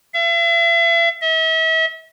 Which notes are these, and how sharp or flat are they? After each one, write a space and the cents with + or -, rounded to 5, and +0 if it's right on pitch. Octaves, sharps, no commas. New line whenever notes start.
E5 +40
E5 -40